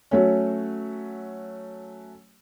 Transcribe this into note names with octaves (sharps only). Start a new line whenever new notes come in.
F#3 A3 C#4